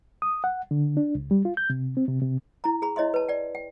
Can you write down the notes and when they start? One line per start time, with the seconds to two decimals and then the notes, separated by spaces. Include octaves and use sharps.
0.22 D#6
0.44 F#5
0.71 D3
0.97 D4
1.15 C#2
1.31 G3
1.45 F4
1.57 G6
1.70 C3
1.97 C4
2.08 C3
2.22 C3
2.64 E4 A#5
2.82 G#4 A#5 B5
2.96 E4 C#5 D#5 E5 C6
3.14 B4 A5
3.29 D5 G5
3.55 G5